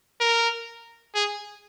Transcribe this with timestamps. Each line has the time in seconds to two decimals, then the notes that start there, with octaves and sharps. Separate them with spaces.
0.20 A#4
1.15 G#4